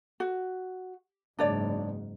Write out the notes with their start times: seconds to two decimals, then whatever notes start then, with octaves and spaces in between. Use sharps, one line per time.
0.20 F#4
1.39 F#1 G#2 D4 C#5 D5